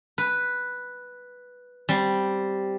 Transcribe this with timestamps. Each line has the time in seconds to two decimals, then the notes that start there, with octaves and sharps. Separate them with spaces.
0.18 B4
1.89 G3 C4